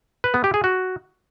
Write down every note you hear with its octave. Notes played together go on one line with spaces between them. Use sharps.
B4
B3
G4
G#4
F#4